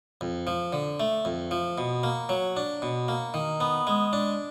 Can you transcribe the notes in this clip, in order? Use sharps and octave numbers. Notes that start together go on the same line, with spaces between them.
F2
F3
D3
A3
F2
F3
B2
A#3
F#3
D4
B2
A#3
D#3
B3
G#3
D4